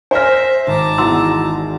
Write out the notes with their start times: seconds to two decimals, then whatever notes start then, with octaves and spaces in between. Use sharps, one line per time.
0.11 C5 E5 G#5 F6 A#6
0.67 G#1 A5 A#5 D6
0.98 E2 E4 F#4 C6 E6